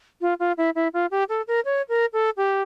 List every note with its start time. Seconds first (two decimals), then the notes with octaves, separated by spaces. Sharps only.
0.21 F4
0.40 F4
0.57 E4
0.75 E4
0.93 F4
1.11 G4
1.29 A4
1.47 A#4
1.65 C#5
1.89 A#4
2.13 A4
2.37 G4